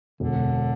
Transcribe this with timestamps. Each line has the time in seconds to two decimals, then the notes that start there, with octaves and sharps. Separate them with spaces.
0.20 E1 D3